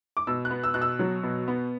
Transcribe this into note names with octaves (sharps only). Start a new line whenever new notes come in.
D6
B2 E6
F#6
B3
E6
B2 F#6
E6
F#3
B2
B3